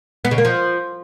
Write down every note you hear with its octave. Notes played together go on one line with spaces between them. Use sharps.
B3
C#3
A#3
F3